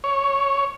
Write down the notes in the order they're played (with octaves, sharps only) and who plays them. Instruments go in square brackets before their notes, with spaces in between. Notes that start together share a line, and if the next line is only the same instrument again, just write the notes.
[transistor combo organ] C#5